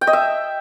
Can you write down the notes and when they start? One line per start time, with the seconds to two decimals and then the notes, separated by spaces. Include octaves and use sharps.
0.01 G5
0.07 D#5
0.13 E5